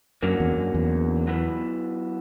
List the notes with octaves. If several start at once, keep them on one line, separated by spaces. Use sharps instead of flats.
F#2 D3 F#3 A#3 C#4
E2
F#2
E2
F#3 B3 E4 B4